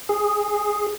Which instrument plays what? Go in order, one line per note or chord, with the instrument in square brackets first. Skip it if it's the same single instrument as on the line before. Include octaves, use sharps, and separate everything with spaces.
[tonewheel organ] G#4